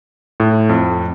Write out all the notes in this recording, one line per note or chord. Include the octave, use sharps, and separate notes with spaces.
A2
F2